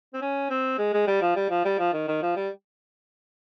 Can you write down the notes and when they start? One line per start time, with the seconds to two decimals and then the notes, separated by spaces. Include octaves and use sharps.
0.14 C4
0.22 C#4
0.50 C4
0.79 G#3
0.94 G#3
1.07 G3
1.22 F3
1.36 G3
1.50 F3
1.65 G3
1.79 F3
1.93 D#3
2.08 D#3
2.22 F3
2.36 G3